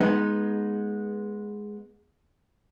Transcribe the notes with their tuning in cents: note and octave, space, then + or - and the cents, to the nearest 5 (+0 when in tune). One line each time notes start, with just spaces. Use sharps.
G#3 +5 B3 -20 D#4 +0